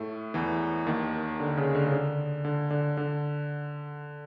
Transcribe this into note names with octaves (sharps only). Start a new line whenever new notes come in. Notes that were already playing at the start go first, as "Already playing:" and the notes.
Already playing: A2 A3
E2 E3
D#2 D#3
D3
C#3
D3
C#3
D3
D3
D3
D3